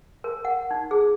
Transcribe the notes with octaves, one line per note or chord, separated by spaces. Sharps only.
A#4
F#5
D#4
G#4